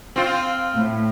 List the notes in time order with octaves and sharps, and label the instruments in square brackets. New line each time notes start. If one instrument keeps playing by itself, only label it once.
[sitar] C4 F4
[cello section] A2